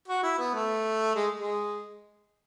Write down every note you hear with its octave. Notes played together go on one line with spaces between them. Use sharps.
F#4
E4
B3
A3
G#3
G#3